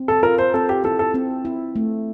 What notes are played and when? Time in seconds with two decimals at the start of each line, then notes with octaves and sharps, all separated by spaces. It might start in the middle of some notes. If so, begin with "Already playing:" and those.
Already playing: C4
0.08 A4
0.23 F4 A#4
0.38 C5
0.54 C4 A4
0.69 G4
0.84 E4 A4
0.99 A4
1.14 C4
1.45 E4
1.76 A3